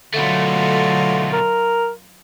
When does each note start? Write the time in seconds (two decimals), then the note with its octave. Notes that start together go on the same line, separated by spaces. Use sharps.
0.14 B2 D3 F#3 A3 F4 D#5
1.33 A#4